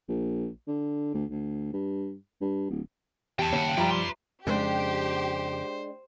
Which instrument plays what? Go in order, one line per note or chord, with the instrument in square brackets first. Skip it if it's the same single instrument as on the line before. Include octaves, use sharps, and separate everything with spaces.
[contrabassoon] A#1
D3
D2
D2
G2
G2
D1
[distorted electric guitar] E2 [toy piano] G4 [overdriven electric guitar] G5 A5
[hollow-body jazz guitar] D#2 [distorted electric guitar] C#3 F#5 [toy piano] C#5
[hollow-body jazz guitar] F3 G3 [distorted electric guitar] B4 D5 [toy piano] E5 A#5
[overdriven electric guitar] C6
[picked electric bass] F2 C#3 [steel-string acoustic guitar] G#3 D4 [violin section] G4 [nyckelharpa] C5